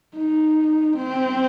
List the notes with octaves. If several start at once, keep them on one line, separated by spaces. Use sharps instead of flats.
D#4
C4